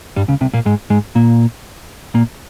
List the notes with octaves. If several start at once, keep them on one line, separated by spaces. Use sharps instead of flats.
G2 G3
C#2 C#3
C2 C3
A#2 A#3
G#2 G#3
G#2 G#3
A#2 A#3
A#2 A#3